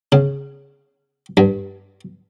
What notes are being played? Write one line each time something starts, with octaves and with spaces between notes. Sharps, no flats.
C#3
G2